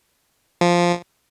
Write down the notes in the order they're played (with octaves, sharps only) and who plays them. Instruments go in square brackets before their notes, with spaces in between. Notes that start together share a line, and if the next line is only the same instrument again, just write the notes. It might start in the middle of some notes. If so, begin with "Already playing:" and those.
[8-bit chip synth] F3